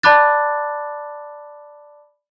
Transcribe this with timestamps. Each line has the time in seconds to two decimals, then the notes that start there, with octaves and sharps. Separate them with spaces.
0.03 D5 A5 B5 D6 F#6 A6